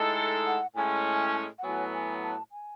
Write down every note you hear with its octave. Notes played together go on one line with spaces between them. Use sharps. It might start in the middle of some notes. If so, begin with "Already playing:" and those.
Already playing: A2 G#3 D#4 A4
F#5
A2 G#3 C#4 G#5
F#5
A2 F#3 B3 G#5
G#5
A5
G#5